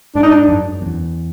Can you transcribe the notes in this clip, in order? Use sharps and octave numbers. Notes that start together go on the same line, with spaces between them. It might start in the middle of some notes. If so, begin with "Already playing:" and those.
G#2 D4
D#4
D4
F#2
E2